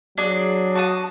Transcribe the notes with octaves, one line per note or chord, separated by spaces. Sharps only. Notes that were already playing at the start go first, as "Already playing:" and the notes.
F#3 D4 F#4 G#4
F#4 A5 D#6